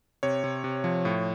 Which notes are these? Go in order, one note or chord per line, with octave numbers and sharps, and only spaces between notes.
C3 C#5
C3
C3
F3
A2